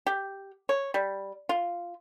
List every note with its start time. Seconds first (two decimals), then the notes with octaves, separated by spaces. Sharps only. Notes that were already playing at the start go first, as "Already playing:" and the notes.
0.06 G4
0.69 C#5
0.94 G3
1.49 F4